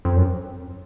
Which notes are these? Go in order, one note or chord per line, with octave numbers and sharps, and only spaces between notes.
F2
F#2